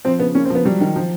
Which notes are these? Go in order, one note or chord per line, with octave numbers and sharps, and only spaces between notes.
F3 C4
C#3 B3
A#3 C#4
C4
F3 B3
F#3 G3
D#3
F3